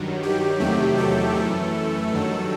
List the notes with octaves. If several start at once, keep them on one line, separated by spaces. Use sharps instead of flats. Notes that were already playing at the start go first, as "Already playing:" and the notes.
Already playing: G2 D#3 F#3
G4
E2 C3 D#3 F#3 A3 G4
A4
F#2 E3 A3
G2 D#3 F#3